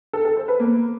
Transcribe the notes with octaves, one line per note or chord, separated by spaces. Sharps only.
A4
A4
C5
B4
A#3